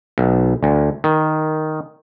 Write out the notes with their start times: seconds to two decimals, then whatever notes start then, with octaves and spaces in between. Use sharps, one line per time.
0.18 B1
0.63 D2
1.04 D#3